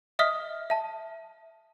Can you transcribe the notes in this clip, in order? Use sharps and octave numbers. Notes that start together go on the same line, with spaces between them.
D#5 E5 D#6 F6 B6 G7
E5 A5